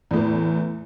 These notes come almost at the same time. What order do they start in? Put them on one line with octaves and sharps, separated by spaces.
E2 A2 E3